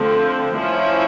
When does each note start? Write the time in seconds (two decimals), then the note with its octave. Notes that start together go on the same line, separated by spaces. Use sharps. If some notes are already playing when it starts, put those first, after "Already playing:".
Already playing: D3 F3 A3 C4
0.54 F3 A3 C#4 E4